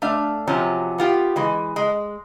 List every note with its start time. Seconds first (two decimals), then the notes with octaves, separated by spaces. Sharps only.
0.02 A3 D4 F5
0.47 C3 F3 F#3 C#4
0.98 B3 F4 G4
1.36 E3 G#3
1.76 G#3